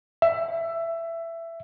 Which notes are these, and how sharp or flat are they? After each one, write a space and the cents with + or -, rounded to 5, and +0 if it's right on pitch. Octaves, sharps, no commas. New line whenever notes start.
E5 +15